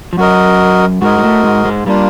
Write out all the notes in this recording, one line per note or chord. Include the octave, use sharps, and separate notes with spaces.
F3
F#2 F#3 F#4 A#4 D#5
G#2 G#3 F#4 A#4 D#5
G#3
A2 A3
G#2 G#3
G#2 G#3
G3 A#3 D4 F4